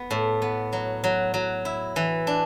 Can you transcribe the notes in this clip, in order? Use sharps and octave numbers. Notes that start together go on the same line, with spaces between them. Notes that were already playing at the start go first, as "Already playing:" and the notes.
Already playing: B3
A2
B3
F#3
F#3
F#3
E4
E3
D4